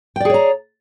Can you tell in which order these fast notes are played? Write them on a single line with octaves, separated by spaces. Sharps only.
G5 D5 G#4 C#5 A#5